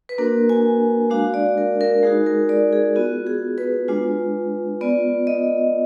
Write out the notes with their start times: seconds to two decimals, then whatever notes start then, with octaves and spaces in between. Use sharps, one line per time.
0.09 B4
0.18 A#3 D4 F#4 A#4
0.49 G#5
1.10 G#3 D4 F#4 F5
1.34 D5
1.58 A#4
1.81 A#4
2.03 G#3 D#4 F#4 G#4
2.26 A#4
2.49 D5
2.73 G#4
2.96 B3 F4 F#4
3.27 G#4
3.58 B4
3.88 G#3 D4 F4
4.81 B3 F4 D5
5.27 D#5